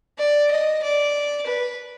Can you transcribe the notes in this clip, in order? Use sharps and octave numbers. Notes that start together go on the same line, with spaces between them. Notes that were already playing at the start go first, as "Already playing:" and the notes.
D5
D#5
D5
B4